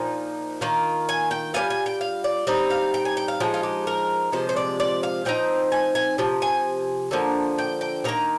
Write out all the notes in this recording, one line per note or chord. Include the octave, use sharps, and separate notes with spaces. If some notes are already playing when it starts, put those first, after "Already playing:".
Already playing: A#2 F3 D#4
D#3 A#3 F4
G#5
G5
G3 A#3 F4 G#5
G#5
G5
F5
D5
G3 C4 D#4 D#5
F5
G5
G#5
G5
F5
F3 G#3 D#4 G4
F4
G4
A#4
C3 F3 G#3 C5
C5
D5
D5
F5
F3 C4 D#4 G5
G#5
G#5
C3 F3
G#5
D3 F3 A#3
G5
G5
C3 D#3 A#3 A#5